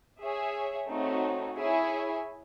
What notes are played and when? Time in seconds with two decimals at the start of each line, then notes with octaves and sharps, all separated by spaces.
0.20 G#4 C#5 E5
0.88 A3 C4 D#4 F#4 C#5
1.57 E4 G#4 C#5 E5 G#5